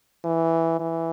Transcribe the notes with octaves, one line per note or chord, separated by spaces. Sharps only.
E3
E3